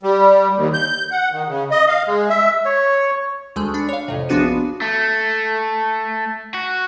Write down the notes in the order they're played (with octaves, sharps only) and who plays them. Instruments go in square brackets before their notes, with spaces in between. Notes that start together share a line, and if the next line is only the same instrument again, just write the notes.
[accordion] G3
D#2
G6
F#5
D#3
C#3
D#5
F5
G#3
E5
[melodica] C#5
[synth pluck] D2 G#3 A3
D4 B5 C#7
C#5 F5
F2 A2 C3
A#1 F3 B3 D4 F#4 D#7
[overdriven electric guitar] A3
F#4